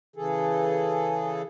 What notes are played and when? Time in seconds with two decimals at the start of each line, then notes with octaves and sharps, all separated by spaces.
0.16 C#3 E3 G#4 A4